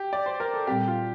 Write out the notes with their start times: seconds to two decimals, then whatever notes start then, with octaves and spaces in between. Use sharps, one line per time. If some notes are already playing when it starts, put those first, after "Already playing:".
Already playing: G4
0.13 D5
0.26 C5
0.40 A#4
0.54 A4
0.67 A#2 G3 C4 G4
0.88 F4